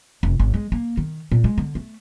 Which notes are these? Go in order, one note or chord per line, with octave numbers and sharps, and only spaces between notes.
F1
G#1
G#3
A#3
D#3
A#2
G#3
D3
A3